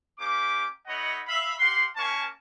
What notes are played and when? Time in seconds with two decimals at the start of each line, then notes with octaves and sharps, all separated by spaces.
0.19 A#3 C#4 G4 D6
0.87 A3 D#4 C#5 D#5 F#5 B5
1.27 E5 F5 B5
1.59 G4 F5 F#5 C6
1.96 A#3 C#4 A#4 G#5 A5 C#6